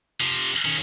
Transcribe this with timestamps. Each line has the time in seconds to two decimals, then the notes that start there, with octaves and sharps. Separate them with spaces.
0.21 C3 F3
0.65 D#3 C#4